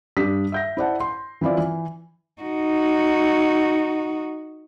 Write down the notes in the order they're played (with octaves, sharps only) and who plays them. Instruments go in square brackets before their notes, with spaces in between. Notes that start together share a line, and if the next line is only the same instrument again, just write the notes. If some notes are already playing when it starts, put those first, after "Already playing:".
[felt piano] G2 G3 D4 G4 D#6 B6
E5 G6 A#6
E4 C5 D5 F#5 A5
C6
E3 C4 E4 F4 D5
E3
[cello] D#4 F#4